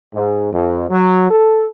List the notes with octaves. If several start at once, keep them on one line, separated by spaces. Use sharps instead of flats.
G#2
F2
F#3
A4